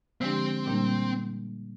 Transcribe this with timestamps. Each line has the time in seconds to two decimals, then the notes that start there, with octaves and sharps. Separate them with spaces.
0.21 D3 F3 G#3 C4 D4 G4
0.66 A#2 G3 A#3 D4